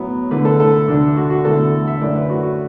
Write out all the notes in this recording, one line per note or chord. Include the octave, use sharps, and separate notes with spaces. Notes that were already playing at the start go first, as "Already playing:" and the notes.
Already playing: A2 F#3 B3
D3 A3 E4 B4
A4
A4
D2 D3 A3 D4
F#4
F#4
E2 D3 A3 E4 A4
E5
F#2 D3 A3 E4 D5
B4
F#4
F#4